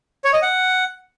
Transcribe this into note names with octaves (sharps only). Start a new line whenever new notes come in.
C#5
D#5
F#5